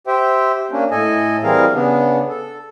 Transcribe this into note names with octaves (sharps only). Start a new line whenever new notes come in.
G4 C5 E5 G5
A#3 C#4 D4
A2 A4 D#5 G#5
E3 G3 C4 G#4 A#4 F5
C#3 B3 D4
A4